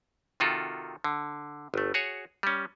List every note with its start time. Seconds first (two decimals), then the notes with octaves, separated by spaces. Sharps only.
0.40 C3 D#3 F4 F#4 A4
1.04 D3
1.74 G1 A3
1.94 F#4 G#4 C#5
2.43 G3 C#4